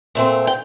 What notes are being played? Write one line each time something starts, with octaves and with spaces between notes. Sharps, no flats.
A#2 A3 C4
G5